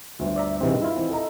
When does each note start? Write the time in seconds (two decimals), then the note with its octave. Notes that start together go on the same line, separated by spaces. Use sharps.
0.19 G1 D2
0.36 D5 E5 A#5
0.61 G2 C3 E3 C4 D#4 G#4
0.82 E4 F4
0.95 E3 C4 D#4
1.09 A4 D#5 A#5